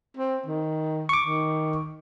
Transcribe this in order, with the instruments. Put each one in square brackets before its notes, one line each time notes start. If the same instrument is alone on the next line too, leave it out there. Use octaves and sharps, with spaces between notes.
[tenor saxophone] C4
D#3
[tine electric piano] C#6 D6
[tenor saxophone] D#3